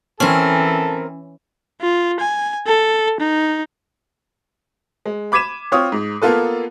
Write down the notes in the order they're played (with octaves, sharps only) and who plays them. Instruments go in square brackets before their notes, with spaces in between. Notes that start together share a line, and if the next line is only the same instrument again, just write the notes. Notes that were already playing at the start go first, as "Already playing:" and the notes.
[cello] E3 [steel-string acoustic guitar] C4 A#4 [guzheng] C#4 [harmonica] A4
[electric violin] F4
G#5
A4
D#4
[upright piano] G#3
B5 D6 G#6 B6 D#7 E7
C4 F4 C#5 D#6
G#2
A#3 B3 F4 A4 B4